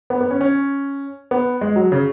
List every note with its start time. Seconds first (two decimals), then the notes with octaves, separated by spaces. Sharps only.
0.10 B3
0.21 B3
0.31 C#4
0.41 C#4
1.31 B3
1.61 G#3
1.76 F#3
1.92 C#3